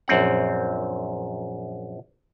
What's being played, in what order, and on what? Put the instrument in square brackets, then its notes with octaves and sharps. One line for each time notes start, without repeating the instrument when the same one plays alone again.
[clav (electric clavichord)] A#1 F#2 C4 F#5